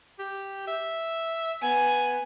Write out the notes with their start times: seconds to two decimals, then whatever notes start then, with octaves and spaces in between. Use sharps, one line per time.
0.19 G4
0.67 E5
1.62 B3 G#5